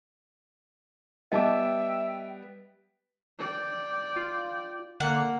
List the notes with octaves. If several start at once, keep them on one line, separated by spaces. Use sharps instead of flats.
G3 B3 D#5 E5 G5 A5 D6
D5 G5
F4
D3 A#3 F#5